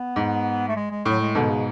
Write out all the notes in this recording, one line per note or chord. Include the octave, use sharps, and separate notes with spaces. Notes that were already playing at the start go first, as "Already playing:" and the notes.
Already playing: B3
G#2
A3
G#3
G#3
A2 F#3
G#3
G#2 B2 D3
C#3